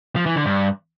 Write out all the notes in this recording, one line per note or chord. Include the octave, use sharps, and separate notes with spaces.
F3
E3
D3
G2